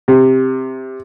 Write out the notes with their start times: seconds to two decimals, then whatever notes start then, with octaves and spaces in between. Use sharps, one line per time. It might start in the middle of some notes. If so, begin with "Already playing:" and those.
0.08 C3